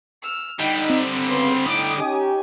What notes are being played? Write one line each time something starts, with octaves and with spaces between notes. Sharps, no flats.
E6 F6
D3 G3 D#4 G5 B5
C4
C#3 B3 C6
A2 D#4 G5 D6 D#6
C#4 D#4 G4 G#5